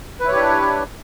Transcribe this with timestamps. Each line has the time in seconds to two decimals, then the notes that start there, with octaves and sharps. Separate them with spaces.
0.20 B4
0.24 E4
0.28 C#5
0.32 G4
0.36 D4